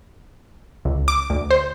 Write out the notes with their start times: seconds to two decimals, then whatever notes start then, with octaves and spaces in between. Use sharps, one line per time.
0.85 C#2
1.08 D6
1.30 D2
1.51 C5